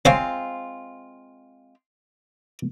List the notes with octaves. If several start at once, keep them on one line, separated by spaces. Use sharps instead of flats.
G#3 C4 F4 C5 C#5 F5